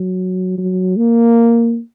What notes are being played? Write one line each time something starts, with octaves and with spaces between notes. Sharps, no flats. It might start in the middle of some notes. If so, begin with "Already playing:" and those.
Already playing: F#3
F#3
A#3